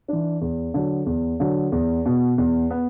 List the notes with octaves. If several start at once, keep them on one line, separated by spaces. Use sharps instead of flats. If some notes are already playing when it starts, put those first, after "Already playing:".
E3 D4
E2
D3 F#3
E2
D3 F#3
E2
B2 B3
E2
B3